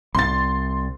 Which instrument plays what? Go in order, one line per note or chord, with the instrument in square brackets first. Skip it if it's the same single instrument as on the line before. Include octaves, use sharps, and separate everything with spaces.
[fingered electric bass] C2 [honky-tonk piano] C6 A6